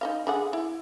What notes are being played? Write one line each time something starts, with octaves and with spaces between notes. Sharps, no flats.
D#4 D#5 F5
D3 G#4 F#5
E4